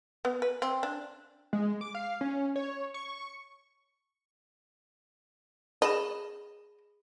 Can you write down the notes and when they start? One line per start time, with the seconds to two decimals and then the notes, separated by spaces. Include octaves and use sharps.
0.25 B3
0.42 B4
0.62 C4
0.83 D4
1.53 G#3
1.81 D6
1.95 F5
2.21 C#4
2.56 C#5
2.94 C#6
5.82 G#4 D#5 B5 E7